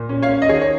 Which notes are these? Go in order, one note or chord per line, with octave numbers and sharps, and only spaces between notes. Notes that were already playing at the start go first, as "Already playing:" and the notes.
Already playing: A#2
C#4
C#5 F5
C#4
D#5
D#3 G#4 C#5
C#5